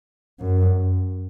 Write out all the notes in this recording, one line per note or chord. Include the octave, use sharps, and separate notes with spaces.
F#2